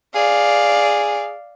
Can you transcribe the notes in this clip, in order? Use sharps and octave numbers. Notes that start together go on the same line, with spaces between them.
G#4 D5 F5